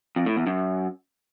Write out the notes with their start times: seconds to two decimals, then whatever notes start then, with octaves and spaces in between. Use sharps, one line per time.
0.16 F2
0.26 A2
0.36 E2
0.46 F#2